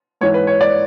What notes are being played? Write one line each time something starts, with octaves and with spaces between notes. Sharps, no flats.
G#2 E3 C#5
B4
C#5
D5